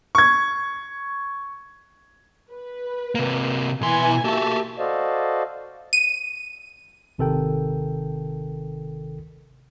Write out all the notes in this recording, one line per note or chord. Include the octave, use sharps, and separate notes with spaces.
C#6 G#6
B4
C3 A#3
B2 E3 G#5 C6
A#3 F#4 G4 E5 A5
F#4 A4 C5 D5 D#5 F5
D#7
G#1 C3 D#3 A4 A#4 G5